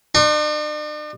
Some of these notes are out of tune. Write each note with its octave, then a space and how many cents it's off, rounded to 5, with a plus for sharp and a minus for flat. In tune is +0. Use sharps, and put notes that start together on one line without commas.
D4 +45 C6 +45